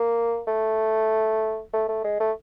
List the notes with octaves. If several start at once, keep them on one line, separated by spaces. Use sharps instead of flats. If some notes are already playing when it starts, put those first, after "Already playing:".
Already playing: A#3
A3
A3
A3
G#3
A3